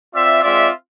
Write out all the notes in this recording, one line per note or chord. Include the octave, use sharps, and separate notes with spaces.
C4 F4 D5 E5
G#3 C4 F4 D5 E5